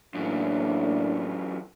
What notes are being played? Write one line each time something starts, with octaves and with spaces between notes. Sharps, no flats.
F#2 A2 E3 A#3 D4